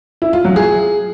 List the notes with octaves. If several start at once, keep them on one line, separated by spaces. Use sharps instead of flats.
E4
F4
F#3
G#4